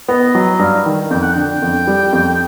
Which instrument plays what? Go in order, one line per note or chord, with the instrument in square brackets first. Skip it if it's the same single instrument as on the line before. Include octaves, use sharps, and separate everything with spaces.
[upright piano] B3 [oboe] D#5
[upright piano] F#3 [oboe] D#5
[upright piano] G2 [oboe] F5
[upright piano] D#3
[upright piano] F2 [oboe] G5
[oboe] F#5
[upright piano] D3 [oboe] G5
[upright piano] F2
G3
F2